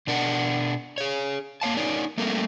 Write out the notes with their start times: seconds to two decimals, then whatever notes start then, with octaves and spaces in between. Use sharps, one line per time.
0.07 B2 D4 A#4 F#5
0.98 G#4 C#5
1.61 A#3 C#5 F5 A5
1.77 D#4 A#4 C#5 D5
2.18 G3 A3 A#3 C4 A#4